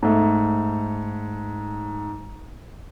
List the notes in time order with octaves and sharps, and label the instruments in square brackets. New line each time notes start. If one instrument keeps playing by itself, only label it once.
[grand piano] G#2 A3